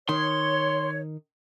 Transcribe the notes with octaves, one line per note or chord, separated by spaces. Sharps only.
D#3 C#5 C6